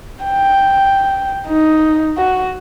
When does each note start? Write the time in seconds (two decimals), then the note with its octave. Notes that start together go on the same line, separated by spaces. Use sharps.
0.25 G5
1.48 D#4
2.17 F#4